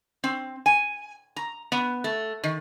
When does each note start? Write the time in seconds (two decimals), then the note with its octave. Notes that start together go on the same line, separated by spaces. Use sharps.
0.24 C4
0.66 G#5
1.36 A#5
1.72 B3
2.04 A3
2.44 D#3